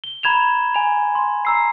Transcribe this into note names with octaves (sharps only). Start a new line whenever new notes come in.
G7
A#5 B5 G#6 E7 F7
G#5 F7
C6
A#5 E6 C7